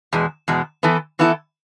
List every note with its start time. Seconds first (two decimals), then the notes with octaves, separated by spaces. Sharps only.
0.13 E2 B2 G#3
0.48 E2 B2 G#3
0.83 E3 B3 E4 A4
1.19 E3 B3 E4 A4